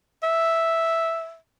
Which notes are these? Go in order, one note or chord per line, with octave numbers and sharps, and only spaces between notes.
E5